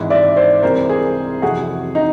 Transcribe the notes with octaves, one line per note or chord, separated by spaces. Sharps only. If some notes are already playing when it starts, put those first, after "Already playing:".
Already playing: G#1 G#2 E3
D5 E5
C5 D5
C2 C3 E3 G#3 A#4 C5
G#4 A#4
F2 C3 E3 A3 F#4 G#4
D#4